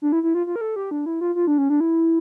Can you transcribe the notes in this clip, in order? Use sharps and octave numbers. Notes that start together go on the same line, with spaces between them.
D4
E4
E4
F4
F4
A#4
A4
G4
D4
E4
F4
F4
D4
C#4
D4
E4